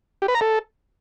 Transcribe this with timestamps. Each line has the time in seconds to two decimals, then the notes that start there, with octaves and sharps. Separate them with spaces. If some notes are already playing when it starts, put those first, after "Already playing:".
0.22 G4
0.28 B4
0.35 A#5
0.41 A4